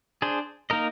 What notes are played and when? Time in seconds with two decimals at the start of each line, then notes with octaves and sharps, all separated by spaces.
0.22 D4 G#4 C5
0.70 A#3 D#4 A#4 D#5